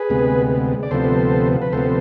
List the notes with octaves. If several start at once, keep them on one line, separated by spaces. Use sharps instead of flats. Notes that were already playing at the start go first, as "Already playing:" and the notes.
Already playing: G#4 B4
D2 C3 G#3 B3
D5
D2 C3 F3 B3 A4 C5
B4
D2 C3 F3 B3 A4 C5